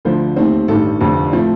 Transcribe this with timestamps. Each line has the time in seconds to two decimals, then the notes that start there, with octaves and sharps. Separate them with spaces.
0.05 D2 D3 F3 C5
0.36 D#2 D#3 A3 C4
0.68 A1 G2 D#3 A4
1.00 F1 F2 D3
1.32 A2 F3 A3 C4